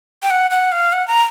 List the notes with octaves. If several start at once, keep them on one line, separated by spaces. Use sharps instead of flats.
G5
F#5
F#5
F5
F#5
A#5